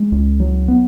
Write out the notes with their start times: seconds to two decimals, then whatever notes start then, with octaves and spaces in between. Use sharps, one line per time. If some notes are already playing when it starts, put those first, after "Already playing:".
Already playing: G#3
0.12 C#2
0.40 F#3
0.68 B3